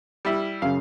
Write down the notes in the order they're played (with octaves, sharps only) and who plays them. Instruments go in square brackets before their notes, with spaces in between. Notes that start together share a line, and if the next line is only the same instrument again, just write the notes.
[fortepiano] G3 E4
[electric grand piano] F#2 C#3 [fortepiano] F5